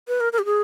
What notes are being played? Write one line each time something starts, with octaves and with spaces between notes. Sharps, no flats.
B4
A#4
A#4
G4
G#4